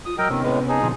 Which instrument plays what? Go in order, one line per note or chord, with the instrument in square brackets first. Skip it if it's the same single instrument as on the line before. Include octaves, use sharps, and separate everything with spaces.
[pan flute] F4 [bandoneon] D#6
[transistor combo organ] F#3 [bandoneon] A#4 D#5 G5 [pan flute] E6
[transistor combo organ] C3 B3 C#4 [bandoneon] D#3
[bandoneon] A2 G#3 [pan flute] B4
[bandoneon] D#4 G#4 [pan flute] A5
[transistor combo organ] B2 D3 F3 [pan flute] C6